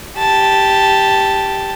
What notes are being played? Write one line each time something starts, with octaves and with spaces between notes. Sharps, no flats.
G4 A5